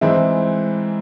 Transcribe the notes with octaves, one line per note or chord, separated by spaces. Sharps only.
G#2 E3 G#3 C4 E4